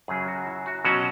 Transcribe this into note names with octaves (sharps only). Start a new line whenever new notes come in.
F#2 C#3 F#3 G#4
F#4
E4
F#4
B2 F#3 C#4 F#4